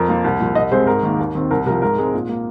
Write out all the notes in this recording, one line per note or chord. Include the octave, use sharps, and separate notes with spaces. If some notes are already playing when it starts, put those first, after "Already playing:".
Already playing: F2 A#4
F3 A#3
C2
A#2 F3
C2 D#5
C3 G#3 C4 C5
G#2 A#4
D#3 A#3
D#2
D#3 C4
C2 A#4
C3 F3 A#4
G#2 A#4
G#3 C4
A#2
A#3